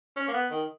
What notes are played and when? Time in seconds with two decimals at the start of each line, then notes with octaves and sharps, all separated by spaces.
0.16 C#4
0.28 A#3
0.34 B3
0.51 D#3